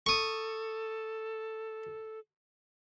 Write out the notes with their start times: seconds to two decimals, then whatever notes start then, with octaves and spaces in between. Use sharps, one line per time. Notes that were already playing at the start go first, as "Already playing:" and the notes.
0.06 A4 C#6 D#6